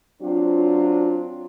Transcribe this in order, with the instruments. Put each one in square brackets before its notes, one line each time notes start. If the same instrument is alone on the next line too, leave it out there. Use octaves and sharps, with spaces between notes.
[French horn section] F#3 C4 D4 F4